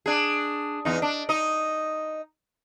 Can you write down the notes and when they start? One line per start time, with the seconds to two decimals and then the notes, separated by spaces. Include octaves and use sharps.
0.06 D4 G#4
0.85 E2 D#4
1.02 D4
1.29 D#4 D#5